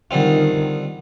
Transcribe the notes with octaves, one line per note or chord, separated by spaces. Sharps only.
D3 D#3 G3 C4 F4